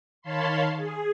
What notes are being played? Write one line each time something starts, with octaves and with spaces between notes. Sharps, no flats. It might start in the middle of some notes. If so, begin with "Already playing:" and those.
D#3 C#5 F5 A5 B5 C6
G#4